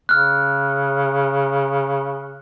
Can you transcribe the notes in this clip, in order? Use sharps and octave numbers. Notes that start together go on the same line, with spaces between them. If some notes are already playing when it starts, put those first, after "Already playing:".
C#3 F6 F#6